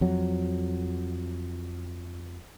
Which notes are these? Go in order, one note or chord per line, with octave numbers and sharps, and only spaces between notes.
F2 F#3